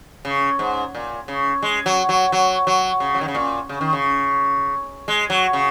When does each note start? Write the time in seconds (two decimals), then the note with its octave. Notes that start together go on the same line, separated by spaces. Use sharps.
0.25 C#3
0.59 G#2
0.95 A#2
1.28 C#3
1.62 G#3
1.86 F#3
2.09 F#3
2.32 F#3
2.67 F#3
3.00 C#3
3.14 F#3
3.21 D#3
3.28 C#3
3.35 A#2
3.69 C#3
3.81 D#3
3.93 C#3
5.08 G#3
5.30 F#3
5.53 C#3